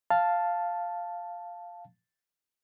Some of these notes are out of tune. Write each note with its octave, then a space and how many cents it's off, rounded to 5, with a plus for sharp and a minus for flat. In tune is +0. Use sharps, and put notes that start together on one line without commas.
F5 +0 A5 +0